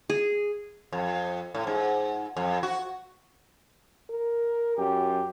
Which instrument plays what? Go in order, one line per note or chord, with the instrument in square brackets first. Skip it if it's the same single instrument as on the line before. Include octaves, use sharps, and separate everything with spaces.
[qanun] G#4
[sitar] F2
A2
G#2
F2
F#4
[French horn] A#4
[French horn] F#2 [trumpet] G4